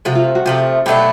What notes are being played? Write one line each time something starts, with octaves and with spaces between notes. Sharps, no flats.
C3 F3 A3 F#4
F4
F#4
C3 F3 A3 G4
B2 F#3 A3 D4 G4